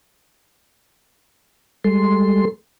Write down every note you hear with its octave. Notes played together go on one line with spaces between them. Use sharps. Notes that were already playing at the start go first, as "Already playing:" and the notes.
G3 G#3 A4 C6